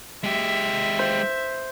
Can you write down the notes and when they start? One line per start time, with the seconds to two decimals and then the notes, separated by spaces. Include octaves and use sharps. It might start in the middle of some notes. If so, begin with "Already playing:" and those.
0.23 G#3 G4 E5
0.99 C5